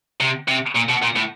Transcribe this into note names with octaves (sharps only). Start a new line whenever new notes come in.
C3
C3
A#2
B2
A#2
A2